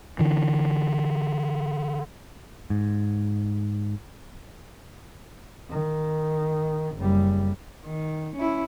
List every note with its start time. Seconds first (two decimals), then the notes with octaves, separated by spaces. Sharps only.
0.19 D3 E3
2.70 G#2
5.71 D#3
6.97 F#1 G3
7.85 D#3
8.36 C#4 E4